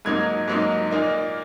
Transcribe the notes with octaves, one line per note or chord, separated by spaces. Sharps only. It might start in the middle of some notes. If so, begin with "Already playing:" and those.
G#2 F#3 A#3 D#4 G#6
G#2 F#3 A#3 D#4
A#2 A#3 D#4